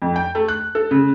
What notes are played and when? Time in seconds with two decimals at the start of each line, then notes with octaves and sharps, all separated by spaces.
0.02 F2
0.16 G5
0.35 A3
0.48 F#6
0.75 A4
0.91 C#3